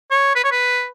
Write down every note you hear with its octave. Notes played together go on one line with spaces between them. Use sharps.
C#5
B4
C#5
B4